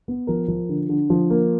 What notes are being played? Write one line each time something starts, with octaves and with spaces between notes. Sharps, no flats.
B3
F3 A#4
F3
D3
D3
F3
A#3